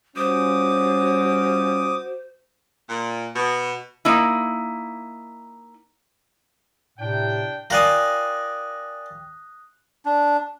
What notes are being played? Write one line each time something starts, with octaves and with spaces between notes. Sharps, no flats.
G3 C#4 F4 F#4 C5 D6 D#6
A#2
B2
A#3 D#4 E4
A2 C3 D4 G5
F4 G4 A#4 D5 G#5 D#6 F#6 A#6
D4